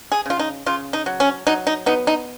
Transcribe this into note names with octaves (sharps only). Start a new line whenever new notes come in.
G#4
C#3 F4
D#4
C#3 F4
D#4
F#3
C#4
F#3 D#4
D#4
B3 D#4
D#4